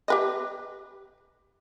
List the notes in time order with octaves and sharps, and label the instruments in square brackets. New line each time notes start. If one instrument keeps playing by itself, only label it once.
[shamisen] G4 B4 D#5